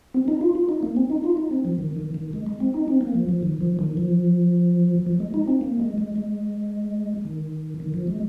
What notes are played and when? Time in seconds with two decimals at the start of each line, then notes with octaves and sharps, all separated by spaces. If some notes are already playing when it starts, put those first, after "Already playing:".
0.14 C4
0.28 D#4
0.41 F4
0.55 F4
0.69 D#4
0.83 A#3
0.97 C4
1.10 D#4
1.24 F4
1.37 D#4
1.51 C4
1.65 F3
1.78 D#3
1.97 D#3
2.14 D#3
2.33 G#3
2.46 G#3
2.60 C4
2.74 D#4
2.88 C4
3.01 A#3
3.15 F3
3.29 F3
3.43 D#3
3.61 F3
3.79 D#3
3.97 F3
5.06 F3
5.20 G#3
5.34 D#4
5.48 C4
5.61 A#3
5.79 G#3
5.98 G#3
6.16 G#3
7.25 D#3
7.80 D#3
7.94 F3
8.07 G#3